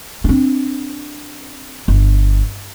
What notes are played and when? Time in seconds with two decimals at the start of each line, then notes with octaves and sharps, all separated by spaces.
0.24 C4 D4
1.88 G1